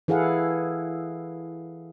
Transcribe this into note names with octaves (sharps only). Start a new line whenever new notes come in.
E3 E4 G#4 A4 F5 F#5